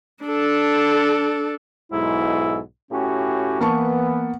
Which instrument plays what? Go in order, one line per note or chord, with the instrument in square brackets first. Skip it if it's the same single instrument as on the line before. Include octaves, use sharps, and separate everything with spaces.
[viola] D4 A4
[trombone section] B1 G#2 [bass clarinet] E4
[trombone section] A2 F#4 G4 [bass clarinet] C#4
[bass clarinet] E3 [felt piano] A#3 A5 C#6 [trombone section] B3